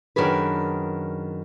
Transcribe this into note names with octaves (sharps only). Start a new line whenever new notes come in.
F#2 D#3 D4 G#4 B4